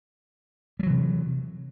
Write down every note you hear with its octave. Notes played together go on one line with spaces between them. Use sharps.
C3 E3 F#3 G3